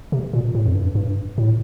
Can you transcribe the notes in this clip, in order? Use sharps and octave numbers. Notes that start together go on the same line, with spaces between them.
C3
A#2
A2
F2
G2
G2
A2